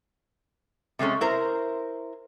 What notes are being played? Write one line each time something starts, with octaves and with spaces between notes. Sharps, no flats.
C3 G#3 A3 C#4
E4 A#4 C5